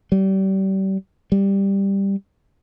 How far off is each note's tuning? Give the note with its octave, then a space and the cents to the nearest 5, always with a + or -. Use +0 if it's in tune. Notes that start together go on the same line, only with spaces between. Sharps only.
G3 -30
G3 +5